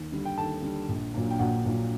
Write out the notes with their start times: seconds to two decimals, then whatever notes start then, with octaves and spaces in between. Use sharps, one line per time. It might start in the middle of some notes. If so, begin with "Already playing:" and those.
Already playing: D#2
0.12 D3 G3
0.25 G5
0.37 D#2 A4 A5
0.63 D3 G3
0.89 A#1
1.14 A#2 F#3 A#3 D4
1.31 G5
1.39 A#1 F#4 F#5
1.65 A#2 F#3 A#3 D4